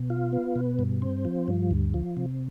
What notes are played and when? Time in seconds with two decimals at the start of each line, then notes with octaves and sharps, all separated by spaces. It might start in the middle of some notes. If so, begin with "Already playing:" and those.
Already playing: B2
0.10 F4
0.33 B3
0.55 B2
0.79 G2
1.02 C4
1.25 F3
1.48 G2
1.71 D2
1.94 F3
2.17 C3